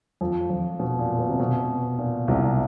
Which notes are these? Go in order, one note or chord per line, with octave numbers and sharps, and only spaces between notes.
F2 F3
F2 F3
B2
A#2
B2
C3
B2
A#2
C2 C3